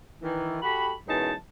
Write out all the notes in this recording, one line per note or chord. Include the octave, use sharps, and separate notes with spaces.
D#3 E3
F#4 G4 A4 B5
F#2 B2 E3 G#3 D#4 A5